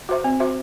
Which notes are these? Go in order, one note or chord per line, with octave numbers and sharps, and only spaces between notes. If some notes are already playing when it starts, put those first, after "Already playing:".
F#4 C5 E5
C4
F#4 C5 E5